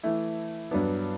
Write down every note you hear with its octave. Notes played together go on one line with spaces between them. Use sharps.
E3 A3 E4
G2 F#3 B3 D4